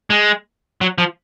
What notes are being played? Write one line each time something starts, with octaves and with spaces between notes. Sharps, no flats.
G#3
F#3
F3